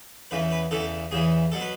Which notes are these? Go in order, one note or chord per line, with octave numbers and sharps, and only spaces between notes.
E2 C#3 E3 B4
B4
E2 C#3 E3 A4
E2 C#3 E3 G#4
B2 F#3 A4
B4